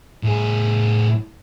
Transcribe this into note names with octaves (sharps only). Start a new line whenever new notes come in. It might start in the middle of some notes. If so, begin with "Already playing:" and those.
A2 G#4